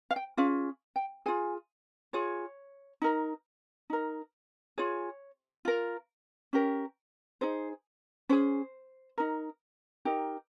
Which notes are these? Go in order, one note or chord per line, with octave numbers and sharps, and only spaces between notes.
F5
G5
C#4 F4 G#4 F5
G5
F4 G#4 G#5
F4 G#4 C#5
D#4 A#4
D#4 A#4
F4 G#4 C#5
F4 A#4
C#4 G4 A#4
D#4 G#4 C5
C#4 G#4 C5
D#4 A#4
D#4 G4 A#4